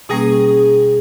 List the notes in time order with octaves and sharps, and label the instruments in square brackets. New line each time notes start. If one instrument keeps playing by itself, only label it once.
[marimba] B2 G3 A#3 C#4 [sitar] G#4